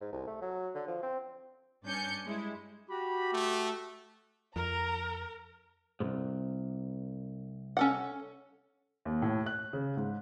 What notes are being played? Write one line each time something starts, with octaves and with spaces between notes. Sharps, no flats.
G#2
C2
A3
F#3
D3
F3
C4
G2 C#4 D4 G#5 G6 C#7
G3 G#3 E4
F#4 G4 B5
A3
F2 A#4 A#5
C2 G#2
C#4 A4 F#5
D#2
A2
F#6
C#3
G#2